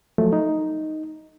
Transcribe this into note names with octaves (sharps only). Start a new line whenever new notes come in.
F3 F#3 A3 A4
D#4